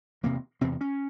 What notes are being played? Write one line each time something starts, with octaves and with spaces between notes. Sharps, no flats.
E2 C3 A#3
E2 C3 C4
C#4